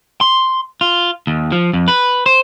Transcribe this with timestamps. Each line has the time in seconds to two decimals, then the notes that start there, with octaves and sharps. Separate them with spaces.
0.21 C6
0.81 F4
1.27 D#2
1.52 F3
1.73 F2
1.88 B4
2.26 C5